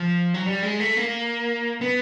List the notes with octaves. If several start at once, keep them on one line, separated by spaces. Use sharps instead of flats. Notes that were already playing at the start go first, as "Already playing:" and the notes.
Already playing: F3
F#3
G3
G#3
A3
A#3
B3